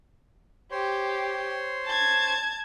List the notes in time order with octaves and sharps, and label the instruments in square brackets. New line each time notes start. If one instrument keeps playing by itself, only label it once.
[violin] G4 [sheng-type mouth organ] C5 C#5 C6
[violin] A5 G#6